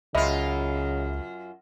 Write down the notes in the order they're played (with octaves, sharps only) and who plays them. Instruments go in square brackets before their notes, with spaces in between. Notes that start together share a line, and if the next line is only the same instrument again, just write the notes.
[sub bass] C#2 [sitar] F#2 F4 [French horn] C#3 [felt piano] D#5 E5 B5